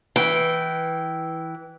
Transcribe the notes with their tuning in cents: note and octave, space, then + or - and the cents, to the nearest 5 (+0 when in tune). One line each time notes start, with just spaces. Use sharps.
E3 -5 G5 -15